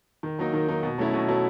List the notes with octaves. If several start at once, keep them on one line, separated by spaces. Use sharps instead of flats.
D#3
F#3 A#3 D#4
D#3
F#3 A#3 D#4
B2
F#3 A3 C#4 E4
B2
F#3 A3 C#4 E4